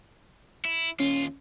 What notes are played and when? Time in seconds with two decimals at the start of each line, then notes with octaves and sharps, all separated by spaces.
0.65 E4
1.00 D#2 C#4 F4